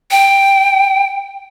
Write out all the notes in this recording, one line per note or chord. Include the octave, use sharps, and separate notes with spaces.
G5